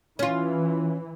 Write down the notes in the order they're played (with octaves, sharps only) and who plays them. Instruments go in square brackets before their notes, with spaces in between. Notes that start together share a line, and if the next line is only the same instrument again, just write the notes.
[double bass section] E3 [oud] C#4 F4